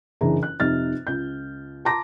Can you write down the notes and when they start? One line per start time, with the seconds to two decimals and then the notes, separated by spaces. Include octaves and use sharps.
0.21 F#1 E3 D4 G#4 A#5
0.43 F#6
0.60 F1 F2 C3 D#4 F6 A6
1.07 C#2 G6
1.85 A5 A#5 C6 D6 A#6